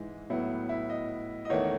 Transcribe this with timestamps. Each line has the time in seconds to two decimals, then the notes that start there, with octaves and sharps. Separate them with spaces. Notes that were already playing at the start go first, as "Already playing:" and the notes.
Already playing: G#2 E3 G#3
0.30 A2 F#3 B3 E4
0.69 E4
0.90 D#5
1.45 D#5
1.50 E2 D#3 A3 C#5